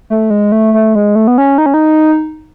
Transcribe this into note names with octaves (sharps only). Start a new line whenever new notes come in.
A3
G#3
A3
A3
G#3
A3
B3
C#4
D#4
C#4
D#4